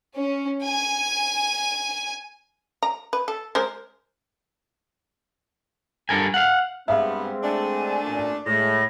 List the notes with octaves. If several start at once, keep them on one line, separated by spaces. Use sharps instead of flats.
C#4
G#5
A#5
B4
A4
G#3 A#4 C5
G2 A4 A#4 G#5
F5 F#5
G2 G#3 B3 C4 E5 F5
A3 D4 G#5
A1 A#2
A2 G#3 A3 A#6